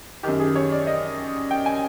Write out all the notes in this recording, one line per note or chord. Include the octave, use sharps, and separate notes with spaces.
F#2 D#3 G4
G#4
C#5
D5
D#5
G5
G#5